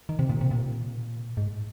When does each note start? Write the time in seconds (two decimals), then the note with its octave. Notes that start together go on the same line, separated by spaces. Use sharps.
0.09 D#3
0.19 C3
0.30 A#2
0.41 C3
0.51 A#2
1.37 G#2